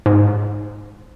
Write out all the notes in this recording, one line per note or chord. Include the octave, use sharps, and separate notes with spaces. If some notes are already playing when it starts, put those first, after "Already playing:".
G#2